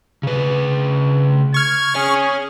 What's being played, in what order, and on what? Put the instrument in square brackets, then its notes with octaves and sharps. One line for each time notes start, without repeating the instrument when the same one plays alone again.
[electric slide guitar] C#3 B4
[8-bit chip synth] C#6 F6 [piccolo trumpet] G#6
[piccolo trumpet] G#4 [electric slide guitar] C#5 G#5